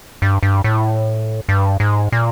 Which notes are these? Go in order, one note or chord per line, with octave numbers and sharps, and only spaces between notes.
G2
G2
A2
G2
G#2
A#2